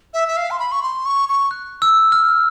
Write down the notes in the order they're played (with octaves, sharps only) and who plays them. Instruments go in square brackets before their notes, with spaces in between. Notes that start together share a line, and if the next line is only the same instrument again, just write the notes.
[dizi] E5
E5
F5
C6
B5
C#6
C6
C#6
C#6
[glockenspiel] F#6
E6
F6